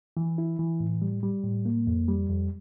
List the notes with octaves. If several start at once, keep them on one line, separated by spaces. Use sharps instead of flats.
E3
E4
E3
A2
G3
G3
A2
A#3
F2
G3
F2